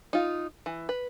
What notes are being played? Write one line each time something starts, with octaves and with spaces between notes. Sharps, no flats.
D#4 F4
E3
B4